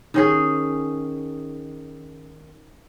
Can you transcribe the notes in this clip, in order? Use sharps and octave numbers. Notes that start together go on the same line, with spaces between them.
D#3 C#4 G#4